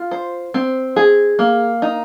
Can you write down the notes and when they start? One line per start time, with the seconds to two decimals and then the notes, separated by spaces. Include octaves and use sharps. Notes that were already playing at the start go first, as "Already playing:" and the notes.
Already playing: F4
0.11 C5
0.54 C4
0.96 G#4
1.39 A#3
1.82 D#4